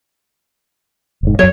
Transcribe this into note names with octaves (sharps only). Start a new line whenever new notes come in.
F1 G#2
F#2 F#3 C#5